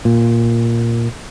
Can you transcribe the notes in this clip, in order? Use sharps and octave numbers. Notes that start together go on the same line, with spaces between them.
A#2